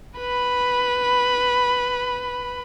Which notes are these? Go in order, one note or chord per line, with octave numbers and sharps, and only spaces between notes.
B4 B5